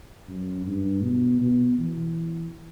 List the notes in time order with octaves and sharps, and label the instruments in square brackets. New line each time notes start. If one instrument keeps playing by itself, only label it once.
[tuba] F#2
G2
B2
B2
E3